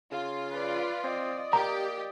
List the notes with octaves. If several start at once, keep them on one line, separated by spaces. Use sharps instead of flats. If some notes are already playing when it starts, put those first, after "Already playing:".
C#3 F4
B4 D5
C4 D5 D#5
A#3 G4 A#5